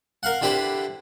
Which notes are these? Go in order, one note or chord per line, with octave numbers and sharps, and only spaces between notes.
A#4 F5 F#5
D3 E4 G4 B4 C5